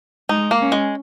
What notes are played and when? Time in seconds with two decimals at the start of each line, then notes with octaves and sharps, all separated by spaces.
0.29 G#3 D#4
0.51 A#3
0.61 C#4
0.72 G#3